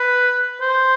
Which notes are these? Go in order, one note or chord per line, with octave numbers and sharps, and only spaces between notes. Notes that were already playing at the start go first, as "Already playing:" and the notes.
Already playing: B4
C5